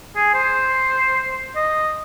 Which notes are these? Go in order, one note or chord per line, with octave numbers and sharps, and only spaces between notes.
G#4
C5
D#5